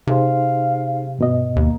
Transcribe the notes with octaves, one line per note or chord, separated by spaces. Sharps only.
C3 D#4 G#4 C5 F5
G2 B2 D#5
D#2 A#3